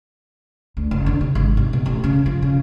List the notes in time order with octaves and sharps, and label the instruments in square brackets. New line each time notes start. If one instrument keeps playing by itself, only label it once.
[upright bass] D2
F#1
D3
C3
G#1
C3
B2
A1
C#3
F3
C#3